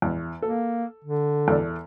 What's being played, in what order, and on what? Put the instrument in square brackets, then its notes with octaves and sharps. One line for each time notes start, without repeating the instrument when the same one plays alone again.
[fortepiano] E2
[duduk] A#3 [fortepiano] A4
[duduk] D3
[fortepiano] E2 A4 D5